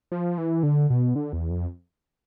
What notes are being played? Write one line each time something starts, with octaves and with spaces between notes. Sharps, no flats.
F3
E3
D3
B2
D3
E2
F2